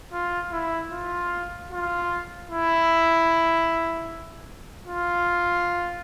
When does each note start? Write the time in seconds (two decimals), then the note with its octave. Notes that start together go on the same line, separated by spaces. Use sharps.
0.13 F4
0.52 E4
0.91 F4
1.71 F4
2.50 E4
4.87 F4